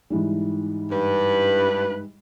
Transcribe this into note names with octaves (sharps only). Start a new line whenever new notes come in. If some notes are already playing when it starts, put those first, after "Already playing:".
G#2 E3 G3
G2 B4